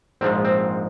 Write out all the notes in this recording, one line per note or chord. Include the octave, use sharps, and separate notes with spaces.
A#1 G#2 F3 G#3 C4
C4